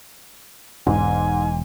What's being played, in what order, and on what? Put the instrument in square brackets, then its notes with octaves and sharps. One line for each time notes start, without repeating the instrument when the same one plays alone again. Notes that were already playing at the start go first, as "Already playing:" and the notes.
[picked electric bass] E1 [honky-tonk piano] G#2 [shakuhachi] G#5